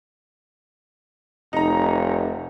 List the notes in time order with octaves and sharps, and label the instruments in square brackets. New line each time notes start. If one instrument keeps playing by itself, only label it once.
[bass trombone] F1 [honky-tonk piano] D#4 A#5